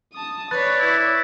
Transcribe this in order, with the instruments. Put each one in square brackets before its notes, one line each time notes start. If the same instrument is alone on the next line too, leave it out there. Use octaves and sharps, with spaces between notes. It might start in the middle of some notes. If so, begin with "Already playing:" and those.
[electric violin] A5 D#6
[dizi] B4 [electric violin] C#5 D5 [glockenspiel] B5 F#6 A6
[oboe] E4